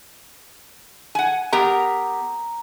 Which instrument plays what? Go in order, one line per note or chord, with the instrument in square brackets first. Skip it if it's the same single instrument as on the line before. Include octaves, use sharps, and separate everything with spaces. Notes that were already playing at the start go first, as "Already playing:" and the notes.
[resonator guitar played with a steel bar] F#5 G#5
[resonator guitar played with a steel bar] B3 G4 A#4 [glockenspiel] A#5